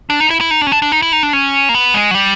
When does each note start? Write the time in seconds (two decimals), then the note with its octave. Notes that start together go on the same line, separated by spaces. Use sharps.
0.10 D4
0.20 D#4
0.30 E4
0.41 E4
0.51 D#4
0.61 D4
0.67 C#4
0.72 D4
0.82 D4
0.92 D#4
1.02 E4
1.12 D#4
1.23 D4
1.33 C#4
1.69 A#3
1.74 B3
1.94 G#3
2.11 F#3
2.15 G3